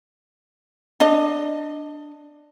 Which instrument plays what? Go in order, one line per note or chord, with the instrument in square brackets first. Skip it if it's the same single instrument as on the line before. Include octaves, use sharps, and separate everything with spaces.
[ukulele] D4 D#5